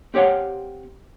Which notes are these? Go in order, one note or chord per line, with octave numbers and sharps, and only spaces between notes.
C4 G4 C#5 F5 F#5